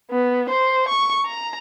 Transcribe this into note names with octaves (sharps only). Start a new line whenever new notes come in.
B3
C5
C#6
A#5